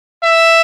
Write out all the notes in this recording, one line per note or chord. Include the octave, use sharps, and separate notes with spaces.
E5